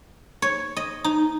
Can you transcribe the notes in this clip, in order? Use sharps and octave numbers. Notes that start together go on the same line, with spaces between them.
C#5
D#5
D#4